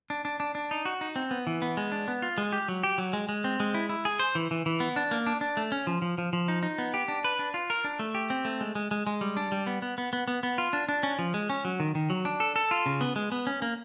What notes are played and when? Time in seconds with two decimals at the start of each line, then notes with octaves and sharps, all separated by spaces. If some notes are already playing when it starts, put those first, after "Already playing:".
0.10 D4
0.25 D4
0.40 D4
0.55 D4
0.71 D#4
0.85 F#4
1.01 D#4
1.16 C4
1.31 B3
1.47 E3
1.62 B3
1.77 G#3
1.92 D4
2.08 B3
2.22 F4
2.38 G#3
2.53 G4
2.68 F#3
2.83 G4
2.98 F#3
3.13 G#3
3.29 G#3
3.44 C4
3.60 G#3
3.74 E4
3.89 E4
4.05 G#4
4.19 C5
4.35 E3
4.51 E3
4.66 E3
4.80 B3
4.96 D4
5.11 A#3
5.27 D4
5.41 D4
5.57 A3
5.72 C#4
5.87 F3
6.02 F3
6.18 F3
6.33 F3
6.48 D#4
6.63 D#4
6.78 B3
6.94 G4
7.08 D4
7.24 B4
7.39 D4
7.54 F4
7.70 A#4
7.84 D4
7.99 A3
8.15 G4
8.30 C4
8.45 A3
8.61 G#3
8.75 G#3
8.91 G#3
9.07 G#3
9.21 G3
9.37 D4
9.52 G3
9.67 B3
9.82 B3
9.98 B3
10.13 B3
10.28 B3
10.43 B3
10.58 F4
10.73 D4
10.89 D4
11.03 C#4
11.19 F3
11.34 G#3
11.50 C#4
11.65 F#3
11.80 D#3
11.95 D#3
12.10 F#3
12.25 D4
12.40 A4
12.56 A4
12.71 F4
12.86 C#3
13.01 B3
13.16 G#3
13.32 B3
13.47 C#4
13.62 A#3